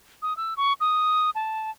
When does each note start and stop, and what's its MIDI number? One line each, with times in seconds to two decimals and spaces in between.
0.22 0.36 87
0.37 0.54 88
0.57 0.73 85
0.80 1.30 87
1.35 1.71 81